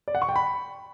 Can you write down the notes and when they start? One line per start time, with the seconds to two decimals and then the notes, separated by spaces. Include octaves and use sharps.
0.08 D5
0.15 F#5
0.22 C#6
0.29 G5
0.36 B5